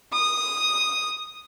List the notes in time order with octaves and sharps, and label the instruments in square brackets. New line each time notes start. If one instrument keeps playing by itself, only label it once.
[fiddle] D#6